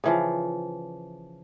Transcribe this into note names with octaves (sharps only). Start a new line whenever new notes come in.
C#3 E3 F3